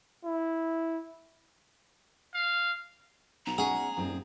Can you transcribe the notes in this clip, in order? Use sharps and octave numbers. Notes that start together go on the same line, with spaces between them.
E4
F5
B1 A#5
G#3 C#4 G#4 F#5
D#1 F#2 C4